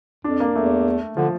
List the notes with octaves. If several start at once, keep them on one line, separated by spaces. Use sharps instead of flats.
F2 D4
A#3
E2 A3
D3 F3